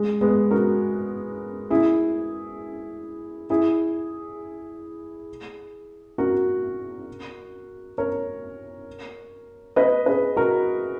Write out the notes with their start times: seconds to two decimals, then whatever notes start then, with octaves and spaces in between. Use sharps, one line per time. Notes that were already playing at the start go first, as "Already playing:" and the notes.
Already playing: G#3
0.21 G#3 B3
0.51 F#4 A#4
1.70 E4 G#4
3.50 E4 G#4
6.18 F#4 A#4
7.98 A#4 C#5
9.76 B4 D#5
10.06 G#4 B4
10.36 F#4 A#4